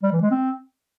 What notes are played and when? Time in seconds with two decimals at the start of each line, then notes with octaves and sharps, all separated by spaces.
0.03 G3
0.12 E3
0.22 G#3
0.31 C4